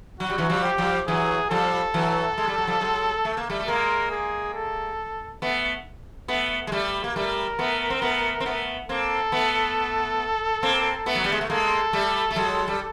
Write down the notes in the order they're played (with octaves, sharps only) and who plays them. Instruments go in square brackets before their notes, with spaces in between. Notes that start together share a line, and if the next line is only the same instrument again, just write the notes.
[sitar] F#3 [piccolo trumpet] F#4
[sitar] G3
E3 F#3
F3 G3
[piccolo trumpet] G4
[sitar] F3 G3
[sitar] E3 F#3 [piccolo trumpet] G#4
[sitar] F3 G3 [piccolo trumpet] A4
[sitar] E3 F#3
G#3
G3
F#3
F3 G3
F#3 G#3
A3
A#3
G3 A3
A3
[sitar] G#3 A#3 [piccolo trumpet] A#4
[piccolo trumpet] G#4
A4
[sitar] A3 B3
A3 B3
G#3
G3 A3
A#3
[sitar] G3 A3 [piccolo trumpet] A#4
[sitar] A3 B3
C4
A3 B3
C4
A3 B3
[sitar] A#3 C4 [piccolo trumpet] A4
[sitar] A3 B3
A#3 C4
A3 B3
F#3
G3
G#3
A3
[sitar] G#3 A#3 [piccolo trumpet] A4
[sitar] G3 A3
A3
F#3 G#3
G3